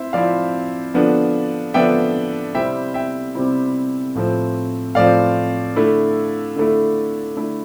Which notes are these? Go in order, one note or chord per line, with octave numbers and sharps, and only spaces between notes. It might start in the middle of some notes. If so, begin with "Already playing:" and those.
Already playing: C4 E4 C5 E5
F3 C4 E4 D5 F5
D3 F3 B3 D4
D3 F3 B3 D4 E5 G5
C3 G3 C4 E4 E5 G5
E5 G5
C3 G3 C4 E4
A2 F3 C4
A2 F3 C4 D5 F5
D3 A3 E4
D3 A3 E4
D3 A3 E4